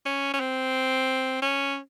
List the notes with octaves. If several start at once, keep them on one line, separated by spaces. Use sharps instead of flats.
C#4
C#4
C4
C#4